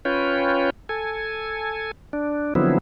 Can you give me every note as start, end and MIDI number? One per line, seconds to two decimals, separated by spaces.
0.05 0.70 61
0.05 0.70 65
0.05 0.70 71
0.05 0.70 73
0.05 0.70 79
0.89 1.91 69
0.89 1.91 80
2.13 2.54 62
2.55 2.78 50
2.55 2.78 53
2.55 2.78 54
2.55 2.78 59
2.55 2.78 60
2.55 2.78 64